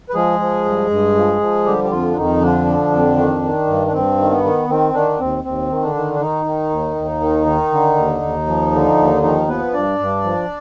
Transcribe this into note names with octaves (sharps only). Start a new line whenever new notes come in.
B4
F3 G#3 G#4
F3
G2
G2
F3
F3
D3 G3 G4
G4
F2 F3 F4
D4
F2 D#3 D#4
D3 F3 D4
D3
F2
D#3
D#3
G2
D4
G2 C4
D#3
B3
D#3
D#3 C4
D3 D#3 D4
D#2 C4
D#2 C4
D#3
D3 D4
D#3
D4
D#3 D#4
D#3
D#2
D#2
D#3
D#3
D3
D#2
D#2
F3
D3
D#2
D#3 F3 D#4
F3 B3 B4
G2 D4 D5
G2
F3